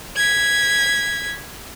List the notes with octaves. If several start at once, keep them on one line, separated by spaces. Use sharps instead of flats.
G#6 B6